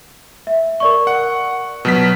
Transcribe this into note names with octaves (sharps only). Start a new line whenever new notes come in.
E5
A#4 D5 C#6
F#5
B2 F#3 B6